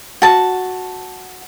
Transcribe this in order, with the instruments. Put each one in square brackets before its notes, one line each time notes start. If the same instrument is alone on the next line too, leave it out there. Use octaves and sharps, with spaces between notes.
[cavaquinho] F#4 A5